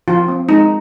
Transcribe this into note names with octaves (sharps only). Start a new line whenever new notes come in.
F3 F4
C4
G#3 D#4